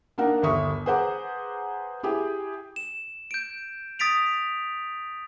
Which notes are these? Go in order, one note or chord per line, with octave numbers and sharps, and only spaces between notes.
A#3 D4 D#4 A#4 F#5 A#5
G1 D#2 E5 C#6 D#6
G#4 B4 C5 F#5 A#5 D6
E4 G4 G#4 G5
E7
G6 D7
D#6 A6 B6 D7 F7